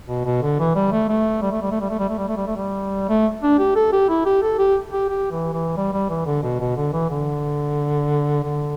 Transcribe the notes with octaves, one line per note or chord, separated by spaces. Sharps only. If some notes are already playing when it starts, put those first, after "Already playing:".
B2
B2
D3
E3
G3
A3
A3
G3
A3
G3
A3
G3
A3
G3
A3
G3
A3
G3
A3
G3
A3
D4
G4
A4
G4
E4
G4
A4
G4
G4
G4
E3
E3
G3
G3
E3
D3
B2
B2
D3
E3
D3
D3